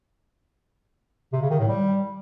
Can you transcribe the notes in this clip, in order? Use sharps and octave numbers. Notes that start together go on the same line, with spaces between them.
C3
C#3
D#3
A2
G3